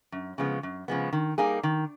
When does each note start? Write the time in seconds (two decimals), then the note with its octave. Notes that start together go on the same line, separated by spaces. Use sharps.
0.12 F#2
0.38 C#3 F3 G#3 B3
0.63 F#2
0.88 C#3 F3 G#3 B3
1.13 D#3
1.38 G3 A#3 D#4 G#4
1.63 D#3